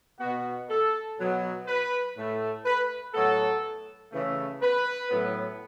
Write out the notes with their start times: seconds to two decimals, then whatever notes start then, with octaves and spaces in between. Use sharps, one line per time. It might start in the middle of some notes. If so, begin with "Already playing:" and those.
0.20 B2 B3 F#4
0.69 A4
1.18 B2 F#3 B3
1.67 B4
2.16 A2 A3
2.65 B4
3.14 A2 F#3 B3 A4
4.12 C#3 E3 A3
4.62 B4
5.11 A2 F#3 B3